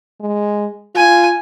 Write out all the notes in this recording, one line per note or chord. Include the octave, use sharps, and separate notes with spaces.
G#3
F4 G#5